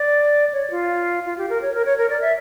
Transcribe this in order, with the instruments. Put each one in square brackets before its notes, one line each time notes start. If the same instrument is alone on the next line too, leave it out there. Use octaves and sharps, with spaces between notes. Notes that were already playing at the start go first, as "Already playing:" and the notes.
Already playing: [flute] D5
C#5
F4
F4
G4
A#4
C#5
A#4
C#5
A#4
D5
E5